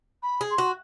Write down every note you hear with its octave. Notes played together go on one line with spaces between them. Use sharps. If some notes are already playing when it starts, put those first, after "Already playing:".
B5
G#4
C6
F#4